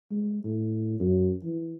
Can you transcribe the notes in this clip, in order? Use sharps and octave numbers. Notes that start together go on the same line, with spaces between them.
G#3
A2
F#2
E3